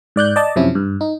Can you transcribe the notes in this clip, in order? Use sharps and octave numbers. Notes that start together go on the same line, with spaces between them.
G#2 D5 F#6 G6
D5 D#5 A5
F#2 C3 F3 C#4 E4
G2
D#4